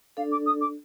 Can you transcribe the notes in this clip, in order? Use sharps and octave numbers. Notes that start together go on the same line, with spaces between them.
D4 A4 D5 F5
D6
D#6
D6